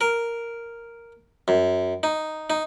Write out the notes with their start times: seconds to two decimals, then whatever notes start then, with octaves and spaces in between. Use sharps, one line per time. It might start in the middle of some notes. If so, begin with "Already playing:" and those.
0.01 A#4
1.48 F#2
2.03 D#4
2.50 D#4